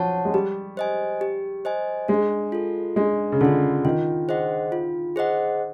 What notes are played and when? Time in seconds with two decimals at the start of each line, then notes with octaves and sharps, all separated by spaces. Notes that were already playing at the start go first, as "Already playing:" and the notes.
Already playing: F3 F#3 C#5 F#5 A5
0.25 G#3
0.34 G3 G4
0.77 C5 D#5 G#5
1.21 G4
1.65 C5 D#5 G#5
2.08 G#3 D4
2.52 F4 A4
2.96 G#3 D4
3.32 C#3
3.41 D3 F4 A4
3.85 D#3 F4
4.29 G#4 C5 D#5 F#5
4.72 F4
5.16 G#4 C5 D#5 F#5